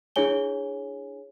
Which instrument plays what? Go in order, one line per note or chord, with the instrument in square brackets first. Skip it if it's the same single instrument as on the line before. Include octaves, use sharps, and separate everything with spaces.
[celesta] D4 E4 G#4 C#5 G#5 G7